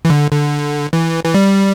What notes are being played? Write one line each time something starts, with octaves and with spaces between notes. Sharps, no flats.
E3
D3
D3
E3
E3
G3